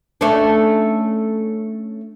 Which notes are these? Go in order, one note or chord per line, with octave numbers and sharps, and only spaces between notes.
A3 C#4 D4